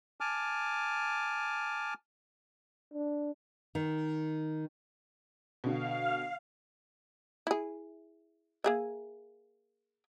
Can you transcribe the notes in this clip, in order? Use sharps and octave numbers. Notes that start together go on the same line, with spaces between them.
G#5 A5 D6 F6
D4
D#3
B2 D3 F5
E4 G#4
A#3 G#4 E5